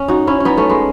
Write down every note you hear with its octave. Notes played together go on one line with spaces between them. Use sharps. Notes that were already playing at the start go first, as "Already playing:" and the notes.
Already playing: C#4
D#4 F#4
C#4 E4
C#4
B3 D#4
A3 C#4
G#3 B3